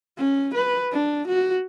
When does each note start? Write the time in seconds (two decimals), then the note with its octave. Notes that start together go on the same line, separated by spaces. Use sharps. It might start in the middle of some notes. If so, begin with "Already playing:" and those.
0.18 C#4
0.55 B4
0.92 D4
1.28 F#4